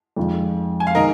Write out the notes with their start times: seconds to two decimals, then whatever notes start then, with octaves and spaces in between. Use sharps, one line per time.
0.16 F2 D#3 G#3 F4
0.80 G#5
0.87 F5
0.95 D#3 G#3 D#4 A#4 D#5